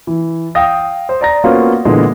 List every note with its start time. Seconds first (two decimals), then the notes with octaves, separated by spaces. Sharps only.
0.07 E3
0.55 F5 G5 D#6 A#6
1.09 C5
1.21 D5 A#5 A#6
1.44 A#3 B3 C#4 F4 F#4 C5
1.85 A#2 D3 E3 G#3 B3